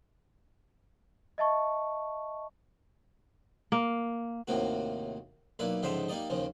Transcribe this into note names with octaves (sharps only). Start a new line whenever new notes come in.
D#5 E5 A5 C#6
A#3
D#2 A2 C3 A#3 F#4
B1 A#3 E4 B4 D5
C#2 G#2 D3 F3 C5 E5
G3 A#3 D#4 D5 D#5
D#2 C#3 F3